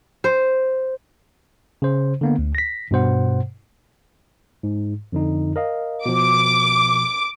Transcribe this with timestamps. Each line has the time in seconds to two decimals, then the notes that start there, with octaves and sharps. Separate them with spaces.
0.24 C5
1.82 C#3 C5
2.21 D3 A#3 B3
2.38 D2
2.55 A#6 B6
2.91 G2 B2 C5 F#5
4.63 G#2
5.12 F2 D3 D#4
5.56 A#4 D#5 F5
6.06 B2 F3 D6